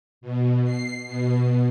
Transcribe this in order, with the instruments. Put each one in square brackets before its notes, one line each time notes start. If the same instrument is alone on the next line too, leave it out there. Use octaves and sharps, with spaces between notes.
[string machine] B2
C7
B2